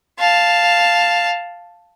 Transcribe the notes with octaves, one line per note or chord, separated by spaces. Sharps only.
F5 A5